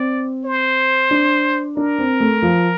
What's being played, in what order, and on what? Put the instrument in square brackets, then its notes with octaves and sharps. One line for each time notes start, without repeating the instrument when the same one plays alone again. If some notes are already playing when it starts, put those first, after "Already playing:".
Already playing: [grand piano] C4 [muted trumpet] D5
[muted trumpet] C5
[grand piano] D4
[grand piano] D4 [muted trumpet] A#4
[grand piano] C4
A3
F3